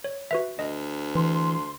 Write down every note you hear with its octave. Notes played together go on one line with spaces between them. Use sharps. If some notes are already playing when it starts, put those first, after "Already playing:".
C#5
F#4 B4 E5
D2 D#5
E3 C6